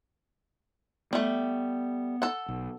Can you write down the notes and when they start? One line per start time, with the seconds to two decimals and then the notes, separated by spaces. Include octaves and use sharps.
1.13 G3 A3 B3
2.22 A4 F#5
2.48 B1